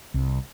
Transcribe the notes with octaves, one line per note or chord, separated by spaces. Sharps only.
C2